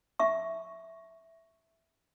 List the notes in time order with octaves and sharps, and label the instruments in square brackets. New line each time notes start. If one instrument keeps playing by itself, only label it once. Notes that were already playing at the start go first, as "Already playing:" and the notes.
[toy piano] E5 C#6